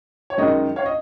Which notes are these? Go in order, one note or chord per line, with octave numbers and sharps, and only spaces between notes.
C#5
F#2 D#3 G#3 D#4 D#5
C#5 F5
D#5